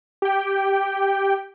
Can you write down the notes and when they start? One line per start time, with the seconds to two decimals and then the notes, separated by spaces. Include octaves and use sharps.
0.22 G4 G5